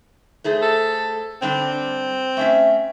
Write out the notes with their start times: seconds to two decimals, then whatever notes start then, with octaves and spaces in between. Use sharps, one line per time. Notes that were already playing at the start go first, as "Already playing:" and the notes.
0.44 A3 G#4 C5
0.62 A4
1.42 D3 G3 C4 D4
2.37 A3 C#4 E5